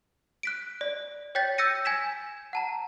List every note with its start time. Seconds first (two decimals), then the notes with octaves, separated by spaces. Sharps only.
0.43 F#6 B6 D7
0.81 D5
1.35 C#5 G5 G6 A6 B6
1.58 E6 G6 A6 A#6 C#7 D#7
1.85 G#5 G#6 B6 E7
2.53 F#5 A5 A#5